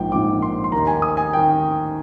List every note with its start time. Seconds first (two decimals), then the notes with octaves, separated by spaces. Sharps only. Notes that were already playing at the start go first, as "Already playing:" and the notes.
Already playing: A#1 G#2 F3 G5
0.12 A#1 G#2 F3 D6
0.42 C6
0.64 C6
0.72 D#2 D#3 A#5
0.87 G#5
1.02 D#6
1.17 G#5
1.33 D#3 G5